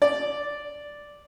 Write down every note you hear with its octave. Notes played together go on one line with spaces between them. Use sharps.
D5